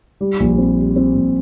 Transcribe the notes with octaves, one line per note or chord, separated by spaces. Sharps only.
G3
A#1
C4
G3
C4
A#1